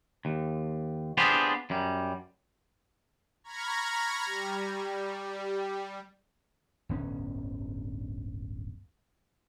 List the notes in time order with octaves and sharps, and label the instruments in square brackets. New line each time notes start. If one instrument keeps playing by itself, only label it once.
[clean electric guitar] D#2
B3 D4 F4 G4 G#4 C5
F#2 G3
[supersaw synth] A#5 B5 C#6 F6 G#6 A#6
G3
[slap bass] D1 G1 B3 C#4